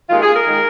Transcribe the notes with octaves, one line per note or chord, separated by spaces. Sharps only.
D#2 D#3 G#3 F4
G#4
A#4
D#3 G#3